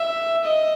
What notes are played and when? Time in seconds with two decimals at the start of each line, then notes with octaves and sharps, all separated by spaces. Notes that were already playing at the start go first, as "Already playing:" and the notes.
Already playing: E5
0.44 D#5